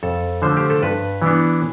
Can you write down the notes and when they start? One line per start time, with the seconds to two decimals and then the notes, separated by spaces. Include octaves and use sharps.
0.03 F2 A4
0.42 D3 F3 A3 C5
0.57 G4
0.70 A4
0.82 G2 B4
1.22 E3 B3 D4